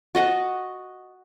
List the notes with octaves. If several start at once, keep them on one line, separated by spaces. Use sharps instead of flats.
F#4 D#5 F#5 A5